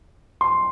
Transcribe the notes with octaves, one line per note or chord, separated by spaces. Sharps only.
C6